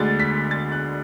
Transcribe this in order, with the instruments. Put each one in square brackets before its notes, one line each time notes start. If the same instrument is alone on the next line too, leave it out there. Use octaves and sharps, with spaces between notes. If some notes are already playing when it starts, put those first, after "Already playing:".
Already playing: [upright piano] D2 D3 G#3 A6
B6
A6
F#6